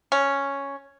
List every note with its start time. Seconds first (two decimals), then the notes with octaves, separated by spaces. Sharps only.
0.12 C#4